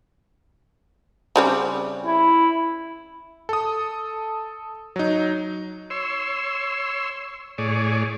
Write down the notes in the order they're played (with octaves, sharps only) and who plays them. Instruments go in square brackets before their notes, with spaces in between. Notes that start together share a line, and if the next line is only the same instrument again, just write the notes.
[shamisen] C#3 G3 C4
[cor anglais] E4
[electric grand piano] A4 D#6
F#3 D#4
[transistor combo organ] C#5 C6 E6
A2 G#4 C#5 D5